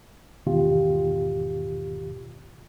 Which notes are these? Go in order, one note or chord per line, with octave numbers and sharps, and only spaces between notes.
E2 G#2 B2 D#3 F4 G4